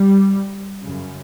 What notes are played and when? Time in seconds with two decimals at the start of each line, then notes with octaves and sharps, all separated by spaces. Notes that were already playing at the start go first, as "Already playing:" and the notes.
Already playing: G3
0.83 F#2 C#3